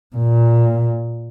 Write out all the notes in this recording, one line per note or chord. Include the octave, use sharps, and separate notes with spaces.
A#2